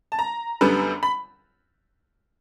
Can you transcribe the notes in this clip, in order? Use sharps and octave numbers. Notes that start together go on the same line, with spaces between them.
A5
A#5
F#2 D3 G3 B3
B5